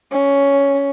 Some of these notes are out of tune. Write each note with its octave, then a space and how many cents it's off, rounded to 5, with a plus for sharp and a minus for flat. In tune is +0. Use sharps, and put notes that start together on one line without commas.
C#4 +10